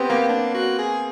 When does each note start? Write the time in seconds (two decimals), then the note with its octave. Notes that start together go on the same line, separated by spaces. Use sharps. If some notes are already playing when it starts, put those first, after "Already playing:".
Already playing: B3 C4 G4
0.10 A#3
0.29 D4
0.54 F#4
0.79 G#4